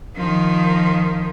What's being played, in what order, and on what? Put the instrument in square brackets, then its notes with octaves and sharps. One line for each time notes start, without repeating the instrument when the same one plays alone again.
[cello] D#3 F3